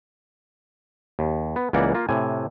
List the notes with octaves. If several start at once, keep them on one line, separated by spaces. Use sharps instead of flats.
D#2
B3
C#2 E3 A#3 D5 F#5
A#3 F4
A2 C3 G#5